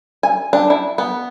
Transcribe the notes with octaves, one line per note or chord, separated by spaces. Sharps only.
G#5
D4
E4
B3